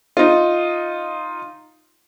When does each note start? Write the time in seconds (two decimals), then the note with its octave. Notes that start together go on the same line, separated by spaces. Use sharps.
0.17 D#4 F4